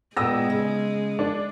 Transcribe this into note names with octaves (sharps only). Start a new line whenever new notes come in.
A#2 G#3 B3 G5 D#6 E6 A#6
C#3
D4